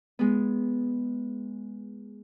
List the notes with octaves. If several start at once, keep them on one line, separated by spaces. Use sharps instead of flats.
G#3 B3